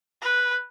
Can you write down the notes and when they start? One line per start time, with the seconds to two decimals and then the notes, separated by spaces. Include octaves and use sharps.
0.22 B4